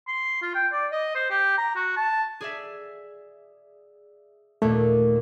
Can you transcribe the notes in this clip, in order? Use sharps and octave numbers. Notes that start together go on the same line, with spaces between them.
C6
F4
G5
D5
D#5
C5
G4
A#5
F#4
A5
G#4 D5 E5
D#2 A#2 A3